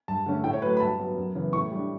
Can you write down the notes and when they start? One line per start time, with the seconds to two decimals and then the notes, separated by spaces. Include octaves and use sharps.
0.08 G2 A5
0.26 D3 A3 C#4
0.44 A2 G5
0.53 C#5
0.62 F#3 A3 B4
0.77 B5
0.80 G2 A5
0.99 F#3 B3
1.17 F#2
1.35 C#3 E3 B3
1.53 A2 C#6
1.71 G3 D4